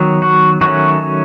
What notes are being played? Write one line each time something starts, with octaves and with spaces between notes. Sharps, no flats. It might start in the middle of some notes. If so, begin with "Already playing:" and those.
Already playing: D#3 F#3 B3
F#4
D#3 F#3 A3 C#4 F#4